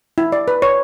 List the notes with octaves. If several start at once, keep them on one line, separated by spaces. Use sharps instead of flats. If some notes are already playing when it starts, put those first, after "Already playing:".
E4
D5
B4
C#5